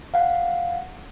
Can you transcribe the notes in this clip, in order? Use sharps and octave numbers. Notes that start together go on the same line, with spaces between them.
F5 F#5